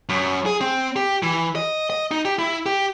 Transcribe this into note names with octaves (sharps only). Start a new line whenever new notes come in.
F#2
G#4
C4
G4
E3
D#5
D#5
D#4
G4
E4
G4